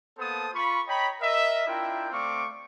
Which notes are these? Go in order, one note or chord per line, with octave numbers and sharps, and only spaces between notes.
A#3 B3 A4 C5 A5 D#6
F4 B5 C#6
C#5 D#5 G5 A#5 B5
A#4 D#5 E5
D4 E4 F4 A#4 G5
A3 C4 D5 F5 C#6 D6